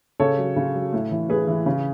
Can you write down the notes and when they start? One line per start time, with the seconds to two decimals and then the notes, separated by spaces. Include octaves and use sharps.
0.20 C#3 A4 C#5
0.38 F#3
0.56 C#3
0.75 F#3
0.93 A2
1.11 E3
1.29 A2 G#4 B4
1.48 E3
1.66 C#3